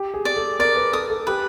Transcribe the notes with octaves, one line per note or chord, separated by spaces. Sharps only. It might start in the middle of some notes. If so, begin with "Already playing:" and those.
Already playing: G4
G#4
D5
A4
A#4 D5
B4
A4 D#6
A4
G4 B4